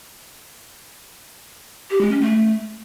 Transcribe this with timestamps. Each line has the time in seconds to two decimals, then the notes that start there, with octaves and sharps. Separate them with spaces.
1.91 G4
2.01 G#3
2.11 C#4
2.21 A3